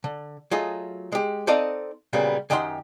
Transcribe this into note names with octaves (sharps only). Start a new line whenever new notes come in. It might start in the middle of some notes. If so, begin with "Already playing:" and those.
D3
F#3 A3 F4 G#4 D#5
G#3 G4
C4 D#4 A4 D5 D#5 F5
A#2 C#3 F#3 G3 A#3 B3
F#2 D#3 G4 D#5 F#5 C6